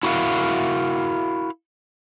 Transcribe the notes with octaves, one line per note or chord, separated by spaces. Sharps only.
E4 F#4 A#4 F5